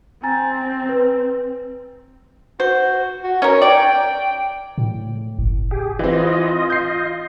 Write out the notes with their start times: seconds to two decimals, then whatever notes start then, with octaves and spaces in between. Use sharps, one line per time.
0.23 C4 G#5 A#5 A6
0.89 B4
2.60 F#4 C5
3.23 F#4
3.42 C#4 A#4 C#5
3.62 D5 G5
4.78 A2
5.39 F#1
5.71 G4 G#4
5.99 E3 C4 F4 D#5
6.70 G6 C7